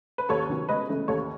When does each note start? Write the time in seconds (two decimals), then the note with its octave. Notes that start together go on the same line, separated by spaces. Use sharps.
0.18 B4
0.29 D#2 A4 C#5
0.49 D#3 F#3 B3
0.69 C#2 B4 D#5
0.89 C#3 E3 A3 E4
1.08 D#2 A4 C#5